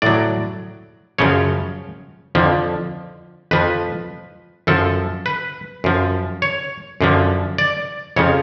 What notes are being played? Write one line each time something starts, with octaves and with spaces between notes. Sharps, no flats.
A2 F#3 D5
F#2 C#3 F3 C#5
F2 D3 F3
F2 F3 B4
F#2 F3 A4
B4
F#2 F3
C#5
F#2 D3 F3
D5
F2 C#3 F3 C#5